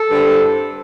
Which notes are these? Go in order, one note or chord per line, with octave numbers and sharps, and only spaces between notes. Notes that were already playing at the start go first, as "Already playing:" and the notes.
Already playing: A4
G2 D3 C4 E4